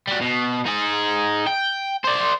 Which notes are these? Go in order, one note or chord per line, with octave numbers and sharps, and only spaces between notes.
G3 F#4
B2
D#4 G#4
G5
C5 D5